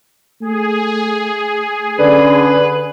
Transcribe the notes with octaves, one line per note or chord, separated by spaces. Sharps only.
A3 G#4
D3 C#4 B4